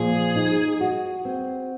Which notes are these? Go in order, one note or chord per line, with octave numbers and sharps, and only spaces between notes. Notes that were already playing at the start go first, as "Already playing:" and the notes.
Already playing: A#2 F3 G#4
D#4
F#4
C4